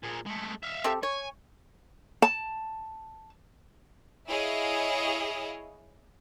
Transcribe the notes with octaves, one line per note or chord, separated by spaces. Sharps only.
A#2 G#4
G#3 A3
E5 F5
C4 G4 A4
C#5 G#5
A5
E4 G#4 C#5 D#5 F5